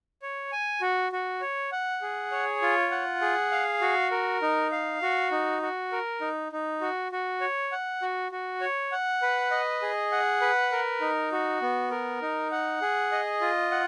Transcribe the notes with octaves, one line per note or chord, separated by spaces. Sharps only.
C#5
G#5
F#4
F#4
C#5
F#5
G#4
C#5
F4
F#5
G#4
F5
F#4
A#4
D#4
F5
F#4
D#4
F#4
A#4
D#4
D#4
F#4
F#4
C#5
F#5
F#4
F#4
C#5
F#5
B4
D#5
G#4
F#5
B4
A#4
D#4
F#4
B3
A#4
D#4
F#5
G#4
D#5
F4
F#5